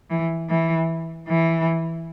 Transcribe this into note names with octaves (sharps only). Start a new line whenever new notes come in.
E3
E3
E3